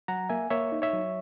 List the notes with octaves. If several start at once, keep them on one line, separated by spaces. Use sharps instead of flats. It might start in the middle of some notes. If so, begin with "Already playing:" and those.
F#3 F#5 A#5
A#3 E5 G#5
A#3 C#5 E5
D#4
C#5 E5
F#3